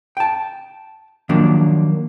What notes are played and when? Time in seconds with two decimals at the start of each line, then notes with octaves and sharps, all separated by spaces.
0.17 G5 A5
1.29 D#3 F3 F#3 A#3 D4